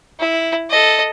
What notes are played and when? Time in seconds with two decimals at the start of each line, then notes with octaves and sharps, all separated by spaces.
0.19 E4
0.70 A4 D#5